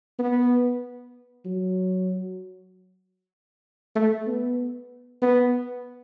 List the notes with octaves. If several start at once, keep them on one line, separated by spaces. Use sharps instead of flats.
B3
F#3
A3
B3
B3